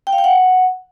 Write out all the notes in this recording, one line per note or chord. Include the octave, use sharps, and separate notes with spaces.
G5
F5
G5
F#5